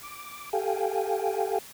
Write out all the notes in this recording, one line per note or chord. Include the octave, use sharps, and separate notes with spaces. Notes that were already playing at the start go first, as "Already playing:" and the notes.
D6
G4 A4 F5 G5 G#5